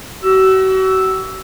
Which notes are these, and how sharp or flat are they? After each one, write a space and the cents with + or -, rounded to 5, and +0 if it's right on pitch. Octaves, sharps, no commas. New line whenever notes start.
F#4 +40 E6 +0